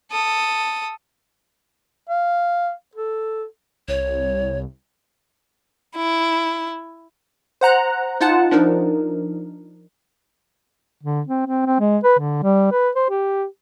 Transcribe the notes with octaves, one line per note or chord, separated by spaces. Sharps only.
A4 D#6
F5
A4
C2 C#5
E4
C5 F#5 A#5 F#6
D#4 F4 F#5 A5
F3 D4 D#4 A#4
D3
C4
C4
C4
G#3
B4
D3
G3
B4
C5
G4